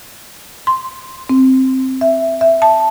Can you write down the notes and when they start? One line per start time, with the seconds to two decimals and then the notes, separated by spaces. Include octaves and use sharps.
0.67 C6
1.29 C4
2.01 E5
2.41 E5
2.62 A5